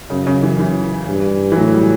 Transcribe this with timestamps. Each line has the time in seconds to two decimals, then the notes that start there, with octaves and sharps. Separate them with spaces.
0.10 F#2 C#3
0.27 C#3
0.43 E3
0.59 E3
1.07 G2
1.52 E3
1.56 A2 F#3
1.74 G3